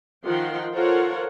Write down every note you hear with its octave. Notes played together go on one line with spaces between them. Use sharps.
D#3 F3 F4 F#5 G5 C6
F4 A4 A#4 C5 C#5 F#5